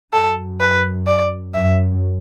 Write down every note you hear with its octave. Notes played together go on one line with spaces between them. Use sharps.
F#2 A4
B4
D5
F#2 E5